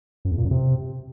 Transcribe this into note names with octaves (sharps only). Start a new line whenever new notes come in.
F#2
E2
A#2
F#2
C3